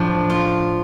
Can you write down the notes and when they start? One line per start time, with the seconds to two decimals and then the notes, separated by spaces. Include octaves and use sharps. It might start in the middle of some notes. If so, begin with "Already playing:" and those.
Already playing: A2 F3 D4
0.30 F4